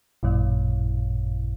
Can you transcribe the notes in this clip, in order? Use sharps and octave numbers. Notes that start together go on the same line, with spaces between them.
A1 F#2 A#2